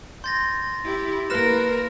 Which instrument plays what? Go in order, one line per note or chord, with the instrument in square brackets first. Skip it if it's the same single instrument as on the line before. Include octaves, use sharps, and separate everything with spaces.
[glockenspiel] C6 A6 A#6 [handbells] G6
[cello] E4 G4
[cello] A#3 A#4 [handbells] E4 B4 [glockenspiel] F6 A#6 E7